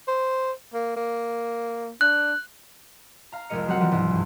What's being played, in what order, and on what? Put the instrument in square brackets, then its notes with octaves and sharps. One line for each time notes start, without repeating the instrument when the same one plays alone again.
[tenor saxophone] C5
A#3
A#3
[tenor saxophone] D4 [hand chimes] F#6
[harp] F5 A#5
F1 C2 G#3 A#4 D#5 C#7
F#3 G3 C4 F#4 A#4 F#5
E3 F3 G3 B3
C2 G#2
E2 G2